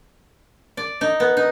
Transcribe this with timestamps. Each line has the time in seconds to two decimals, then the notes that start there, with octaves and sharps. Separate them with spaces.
0.77 D5
1.01 D#4
1.20 B3
1.37 D#4